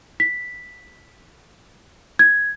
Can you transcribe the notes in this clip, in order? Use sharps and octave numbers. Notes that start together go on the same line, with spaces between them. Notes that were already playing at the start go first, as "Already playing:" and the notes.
B6
G#6